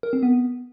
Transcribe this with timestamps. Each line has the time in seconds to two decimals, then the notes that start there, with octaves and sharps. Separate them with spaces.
0.03 A#4
0.13 C4
0.23 B3